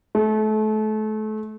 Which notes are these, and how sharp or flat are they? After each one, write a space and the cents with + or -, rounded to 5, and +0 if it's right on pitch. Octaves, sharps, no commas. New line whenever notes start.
A3 -30